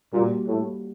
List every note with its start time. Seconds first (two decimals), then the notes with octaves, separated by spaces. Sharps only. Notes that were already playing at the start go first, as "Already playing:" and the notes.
0.12 A#2 G3 A#3 F#4
0.47 A2